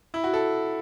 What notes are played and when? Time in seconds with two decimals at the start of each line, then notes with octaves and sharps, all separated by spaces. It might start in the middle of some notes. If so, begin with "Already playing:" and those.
0.14 E4
0.24 F#4
0.33 A4